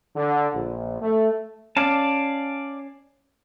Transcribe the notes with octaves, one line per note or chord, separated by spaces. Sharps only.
D3
A#1
A3
C#4 D5 F5 A5